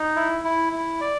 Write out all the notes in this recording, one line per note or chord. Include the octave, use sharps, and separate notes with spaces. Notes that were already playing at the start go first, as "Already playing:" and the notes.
Already playing: D#4
E4
E4
E4
D5